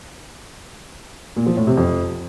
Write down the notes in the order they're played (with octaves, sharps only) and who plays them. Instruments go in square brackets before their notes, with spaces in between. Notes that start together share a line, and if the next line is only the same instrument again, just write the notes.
[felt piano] A#2
F3
A2
C3
F2